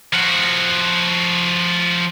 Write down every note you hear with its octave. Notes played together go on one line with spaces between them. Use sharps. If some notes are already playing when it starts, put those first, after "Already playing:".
F3 F#4